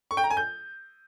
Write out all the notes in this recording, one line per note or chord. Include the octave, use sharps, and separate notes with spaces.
C#6
G5
A#5
G#5
G6